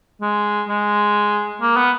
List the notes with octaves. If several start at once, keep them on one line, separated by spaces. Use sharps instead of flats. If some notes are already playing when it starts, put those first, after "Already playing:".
G#3
G#3
A#3
B3